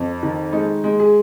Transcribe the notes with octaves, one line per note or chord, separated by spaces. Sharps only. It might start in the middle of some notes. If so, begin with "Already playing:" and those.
Already playing: F2
D#3
G#3 D#4
G#3
G#4